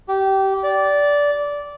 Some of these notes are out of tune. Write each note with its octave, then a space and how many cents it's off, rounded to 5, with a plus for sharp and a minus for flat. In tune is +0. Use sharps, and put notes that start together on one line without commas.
G4 -20
D5 -15